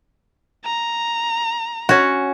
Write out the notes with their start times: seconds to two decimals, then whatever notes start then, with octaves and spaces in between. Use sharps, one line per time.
0.65 A#5
1.89 C#4 F#4